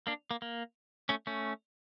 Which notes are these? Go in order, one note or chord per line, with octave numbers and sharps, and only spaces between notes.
A#3 D4
A#3
A#3
A3 C#4
A3 C#4